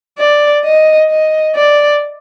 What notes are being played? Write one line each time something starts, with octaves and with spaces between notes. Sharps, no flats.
D5
D#5
D#5
D5